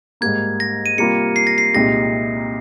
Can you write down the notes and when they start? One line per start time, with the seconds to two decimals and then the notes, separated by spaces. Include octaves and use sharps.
0.21 G#2 G3 A#3 G#6
0.60 A#6
0.86 D#7
0.98 C3 G3 A#3 F4 C#7
1.36 C7
1.47 A#6
1.58 C7
1.74 C2 A#2 G#3 D#4 G4 A#6